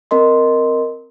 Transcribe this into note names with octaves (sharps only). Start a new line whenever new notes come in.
C4 A#4 D#5 C6